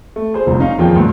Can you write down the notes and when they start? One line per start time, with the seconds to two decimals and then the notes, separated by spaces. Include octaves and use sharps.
0.16 A3
0.34 G#4 C5
0.46 F1 C2 A#2
0.59 C#4 D#4 F5
0.79 F2 A#2 D#3 F3 G#4 G5
0.96 A1 D2 G2